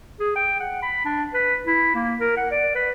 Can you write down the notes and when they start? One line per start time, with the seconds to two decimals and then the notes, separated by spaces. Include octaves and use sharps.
0.20 G#4
0.36 G5
0.60 F#5
0.82 B5
1.05 D4
1.34 B4
1.67 E4
1.95 A#3
2.20 A#4
2.37 F#5
2.51 D5
2.75 B4